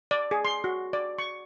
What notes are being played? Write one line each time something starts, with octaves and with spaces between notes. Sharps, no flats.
D5
G#4
C6
F#4
D5
C#6